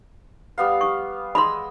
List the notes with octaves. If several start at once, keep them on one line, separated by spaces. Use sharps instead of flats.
G3 B3 F5
C#6
G#3 D#5 B5 C6 E6